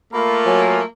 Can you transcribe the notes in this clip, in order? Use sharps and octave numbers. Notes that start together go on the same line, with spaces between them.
A3 A#3 F4 A#4 B5
F#3 G#5